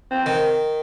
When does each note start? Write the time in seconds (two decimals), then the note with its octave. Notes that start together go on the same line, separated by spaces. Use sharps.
0.11 C4
0.26 D#3